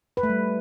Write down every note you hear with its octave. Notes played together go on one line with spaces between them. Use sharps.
B4
A3
G3